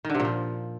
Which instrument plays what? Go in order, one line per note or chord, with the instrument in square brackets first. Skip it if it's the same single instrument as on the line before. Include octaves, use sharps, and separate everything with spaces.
[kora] D#3
D3
C3
A#2
F3